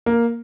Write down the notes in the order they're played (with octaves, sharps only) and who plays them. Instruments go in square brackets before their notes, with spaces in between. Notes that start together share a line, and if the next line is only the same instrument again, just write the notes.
[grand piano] A#3